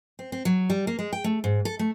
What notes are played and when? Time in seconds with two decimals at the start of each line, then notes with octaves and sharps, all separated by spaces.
0.19 C4
0.32 C4
0.45 F#3
0.70 G3
0.87 A#3
0.99 G#3
1.13 G5
1.24 A3
1.44 G#2
1.65 A4
1.79 A3